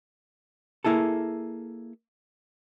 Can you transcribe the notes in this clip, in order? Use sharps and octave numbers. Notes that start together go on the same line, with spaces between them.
A#3 E4 G#4 A4